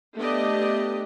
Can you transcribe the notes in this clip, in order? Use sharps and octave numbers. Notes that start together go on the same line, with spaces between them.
A3 B3 D4 G4 D#5